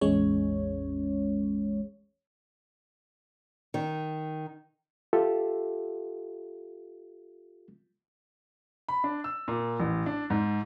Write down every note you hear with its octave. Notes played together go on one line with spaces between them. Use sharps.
A1 E2 G#3 C#4 C#5
D#3
F4 G4 A4 E5
B5
D4
E6
A#2
A1
D4
G#2